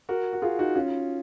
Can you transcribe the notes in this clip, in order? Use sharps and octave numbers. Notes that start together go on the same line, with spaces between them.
F#4 A#4
F#4
F4 G#4
D#4 F#4
C#4 F4